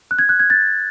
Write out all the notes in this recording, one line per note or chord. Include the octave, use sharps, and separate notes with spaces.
F#6
G#6
F#6
G#6
A6